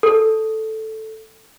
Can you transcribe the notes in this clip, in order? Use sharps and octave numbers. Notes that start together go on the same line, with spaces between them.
A4